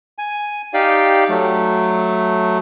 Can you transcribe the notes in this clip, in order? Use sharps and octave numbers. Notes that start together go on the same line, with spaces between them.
G#5
D#4 G4 D5 F5 G5
F#3 A3